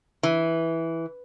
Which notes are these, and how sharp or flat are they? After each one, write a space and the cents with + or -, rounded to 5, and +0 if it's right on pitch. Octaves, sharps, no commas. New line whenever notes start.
E3 -5